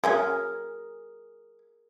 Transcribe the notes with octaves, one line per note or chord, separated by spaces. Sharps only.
F#3 C#4 G#4 A#4 G#5